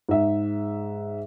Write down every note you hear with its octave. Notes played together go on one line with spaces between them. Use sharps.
G#2 E5